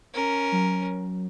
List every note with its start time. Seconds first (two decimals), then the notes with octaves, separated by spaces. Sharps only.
0.14 C#4 A#4
0.52 F#3